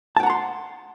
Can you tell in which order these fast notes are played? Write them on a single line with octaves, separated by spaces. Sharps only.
A5 G5 F#5 A#5 C6